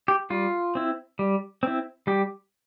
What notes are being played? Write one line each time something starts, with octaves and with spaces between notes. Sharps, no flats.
G4
G3 F4
C4 E4
G3
C4 E4
G3 G4